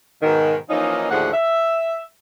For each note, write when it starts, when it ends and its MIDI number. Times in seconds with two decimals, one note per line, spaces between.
0.22 0.55 44
0.22 0.55 47
0.22 0.55 51
0.70 1.11 52
0.70 1.11 53
0.70 1.11 58
0.70 1.11 61
0.70 1.11 63
1.11 1.33 39
1.11 1.33 45
1.11 1.33 50
1.11 1.33 53
1.11 1.33 68
1.11 1.33 78
1.33 1.99 76